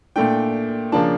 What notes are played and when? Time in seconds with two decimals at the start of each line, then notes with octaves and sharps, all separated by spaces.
0.16 A#2 A3 D4 G5
0.92 C#3 F3 A#3 D4 A5